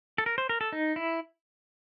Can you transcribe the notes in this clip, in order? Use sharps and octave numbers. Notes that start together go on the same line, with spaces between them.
A4
A#4
C5
A#4
A4
D#4
E4